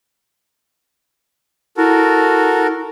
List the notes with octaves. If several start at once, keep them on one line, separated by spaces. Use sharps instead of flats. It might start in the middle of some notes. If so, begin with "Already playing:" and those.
E4 F#4 A4 A#4